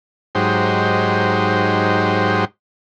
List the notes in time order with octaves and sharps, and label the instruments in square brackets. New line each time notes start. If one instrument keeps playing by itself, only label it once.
[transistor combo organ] G#2 F#3 D#4 G4 C5